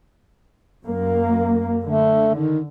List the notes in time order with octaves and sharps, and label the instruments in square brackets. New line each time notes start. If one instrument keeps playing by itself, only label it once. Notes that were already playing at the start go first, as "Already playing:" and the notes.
[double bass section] F#2 A#3
[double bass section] D3 [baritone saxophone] A3
[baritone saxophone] D#3